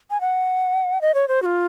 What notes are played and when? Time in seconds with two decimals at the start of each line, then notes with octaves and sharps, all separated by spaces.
0.10 G#5
0.21 F#5
1.01 D#5
1.14 C#5
1.28 C5
1.42 F#4
1.46 F4